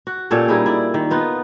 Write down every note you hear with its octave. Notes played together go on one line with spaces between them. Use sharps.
F#4
A#2 C#4 G4 A4
G3 D#4 E4 G#4
E4 D5
D#3
B3 D#4 F4